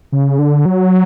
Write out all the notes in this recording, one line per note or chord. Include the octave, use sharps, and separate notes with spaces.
C#3
D3
F#3